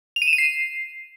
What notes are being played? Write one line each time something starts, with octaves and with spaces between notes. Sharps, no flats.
F7
D#7
E7
D#7
C7